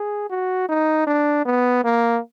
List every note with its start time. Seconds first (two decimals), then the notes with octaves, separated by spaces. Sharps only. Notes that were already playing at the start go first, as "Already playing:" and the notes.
Already playing: G#4
0.30 F#4
0.69 D#4
1.07 D4
1.45 B3
1.84 A#3